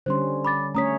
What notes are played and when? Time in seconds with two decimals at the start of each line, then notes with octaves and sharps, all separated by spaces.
0.06 D3 G3 C#4 C5 C6
0.45 B5 D6 A6
0.75 A3 C#4 C#5 A#5 D#6 B6